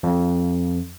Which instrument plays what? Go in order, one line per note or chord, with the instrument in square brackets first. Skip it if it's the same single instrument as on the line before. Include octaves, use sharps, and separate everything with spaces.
[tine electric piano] F2